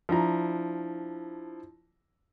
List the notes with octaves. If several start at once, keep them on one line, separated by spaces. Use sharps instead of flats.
F3 D4 E4 A#5